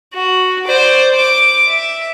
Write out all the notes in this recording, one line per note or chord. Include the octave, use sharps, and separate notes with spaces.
F#4
C5 D5
D6
E5